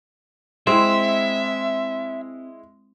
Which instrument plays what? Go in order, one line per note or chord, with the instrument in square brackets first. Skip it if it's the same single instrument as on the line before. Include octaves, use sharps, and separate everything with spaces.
[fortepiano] G#3 E4 [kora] C4 [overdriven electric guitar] E5